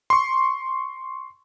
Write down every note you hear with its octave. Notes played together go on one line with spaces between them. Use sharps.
C6 C#6